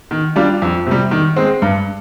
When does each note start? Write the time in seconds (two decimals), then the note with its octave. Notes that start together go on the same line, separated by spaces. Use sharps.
0.11 D#3
0.36 G3 D4 F4
0.62 F2
0.87 C3 G3
1.11 D#3
1.36 G#3 C4
1.62 G2